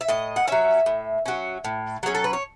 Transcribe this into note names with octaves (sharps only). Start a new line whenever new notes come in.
E5
A2 D#5
F#5
F#3 C#4 E5
A2
F#3 C#4
A2
F#3 C#4 G#4
A4
B4
C#5